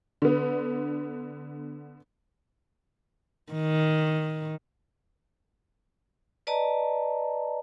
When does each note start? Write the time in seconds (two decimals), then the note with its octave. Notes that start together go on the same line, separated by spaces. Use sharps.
0.22 D3 B3
3.53 D#3
6.47 B4 D5 D#5 A5 A#5